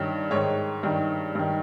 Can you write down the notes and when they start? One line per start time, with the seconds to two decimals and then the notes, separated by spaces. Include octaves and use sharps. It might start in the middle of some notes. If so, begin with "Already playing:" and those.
Already playing: G2 D#3 C#5
0.31 G#2 D#3 C#5
0.83 G2 D#3
1.35 G2 D#3